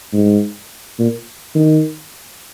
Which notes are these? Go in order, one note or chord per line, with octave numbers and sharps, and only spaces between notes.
G#2
A#2
D#3